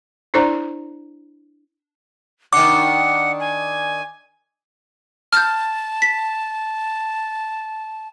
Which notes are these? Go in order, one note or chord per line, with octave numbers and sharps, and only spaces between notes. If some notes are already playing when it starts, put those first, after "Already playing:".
D4 E4 A4 C5 D5 A#5
D#3 D4 F#5 D6
G#5
A5 F6 G6
B6